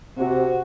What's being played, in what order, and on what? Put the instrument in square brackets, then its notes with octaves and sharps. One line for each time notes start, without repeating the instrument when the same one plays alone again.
[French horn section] C3 [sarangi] F#4